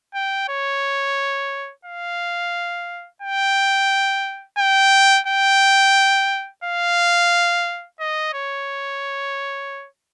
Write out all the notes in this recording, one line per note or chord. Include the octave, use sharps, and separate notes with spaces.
G5
C#5
F5
G5
G5
G5
F5
D#5
C#5